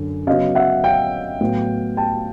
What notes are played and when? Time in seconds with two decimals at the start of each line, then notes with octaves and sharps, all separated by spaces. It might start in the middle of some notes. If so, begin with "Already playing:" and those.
Already playing: F#2 D3
0.27 C#3 F#3 B3 D#5 F5
0.55 E5 F#5
0.84 F5 G5
1.41 A2 F#3 B3
1.97 G5 A5